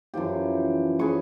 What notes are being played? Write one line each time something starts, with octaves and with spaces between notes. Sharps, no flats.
F#2 E3 F3 G4
C#4 G#4 B4 C#6